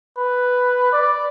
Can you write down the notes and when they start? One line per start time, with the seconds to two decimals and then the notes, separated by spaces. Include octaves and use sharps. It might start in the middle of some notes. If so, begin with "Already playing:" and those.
0.17 B4
0.93 D5